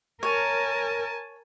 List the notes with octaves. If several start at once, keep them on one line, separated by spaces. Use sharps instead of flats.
A#4 C#5 G#5 A5